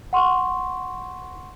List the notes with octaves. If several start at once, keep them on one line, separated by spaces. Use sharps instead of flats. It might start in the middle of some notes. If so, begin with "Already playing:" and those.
F#5 C6 C#6